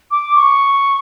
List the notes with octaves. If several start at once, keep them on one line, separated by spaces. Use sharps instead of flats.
D6
C#6